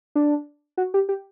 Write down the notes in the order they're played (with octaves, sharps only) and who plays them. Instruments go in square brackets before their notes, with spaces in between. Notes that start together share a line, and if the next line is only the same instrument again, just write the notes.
[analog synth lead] D4
F#4
G4
G4